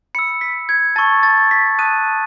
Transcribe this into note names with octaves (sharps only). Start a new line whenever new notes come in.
B5 E6 C#7
B6
G#6
A5 C#6 E6 A6
A6
B6
A5 D#6 F#6 D#7